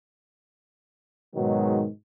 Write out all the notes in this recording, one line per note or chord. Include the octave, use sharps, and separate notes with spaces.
G#2 B2 D#3 F#3 G#3